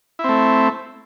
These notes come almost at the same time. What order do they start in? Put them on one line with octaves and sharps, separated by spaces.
E4 C4 A3